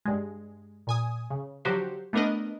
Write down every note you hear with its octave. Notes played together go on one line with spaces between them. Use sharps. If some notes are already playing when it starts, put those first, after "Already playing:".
G2 G#3
A#2 G#5 D#6
C#3
D3 F3 F#3 F#4 G4 C5
A3 B3 D4 A#4 B4 D#5